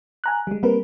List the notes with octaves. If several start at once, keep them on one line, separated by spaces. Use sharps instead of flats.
G#5 A#5 F#6
G3 G#3
G3 A#3 C4 A#4 B4